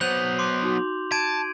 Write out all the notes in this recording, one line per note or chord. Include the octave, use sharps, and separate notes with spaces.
F#3 B3 C5 G6 F7 F#7
C6 D6
D#4 F#4
A5 G#6 D7 D#7